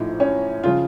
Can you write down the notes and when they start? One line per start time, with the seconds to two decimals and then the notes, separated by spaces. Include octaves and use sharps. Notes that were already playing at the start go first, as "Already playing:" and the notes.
Already playing: A#1 A2 F3 D#4
0.20 C#4
0.64 C#3 F3 F4